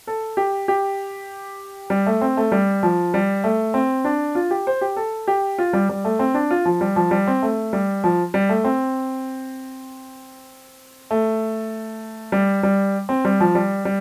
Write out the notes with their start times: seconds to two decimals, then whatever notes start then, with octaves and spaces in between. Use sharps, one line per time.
0.07 A4
0.37 G4
0.68 G4
1.90 G3
2.07 A3
2.21 C4
2.37 A3
2.52 G3
2.83 F3
3.14 G3
3.44 A3
3.74 C4
4.05 D4
4.35 F4
4.51 G4
4.67 C5
4.81 G4
4.96 A4
5.28 G4
5.58 F4
5.73 G3
5.89 G3
6.05 A3
6.19 C4
6.34 D4
6.51 F4
6.65 F3
6.81 G3
6.96 F3
7.11 G3
7.27 C4
7.43 A3
7.73 G3
8.04 F3
8.34 G3
8.49 A3
8.64 C4
11.11 A3
12.32 G3
12.63 G3
13.09 C4
13.25 G3
13.40 F3
13.55 G3
13.85 G3